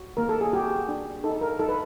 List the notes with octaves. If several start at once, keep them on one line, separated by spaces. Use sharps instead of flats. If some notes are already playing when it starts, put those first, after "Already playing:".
Already playing: F#4
A#3 A#4
A4
G#4
F#4 G4
D4
D#4 A4
A#4
D#4 A4
B4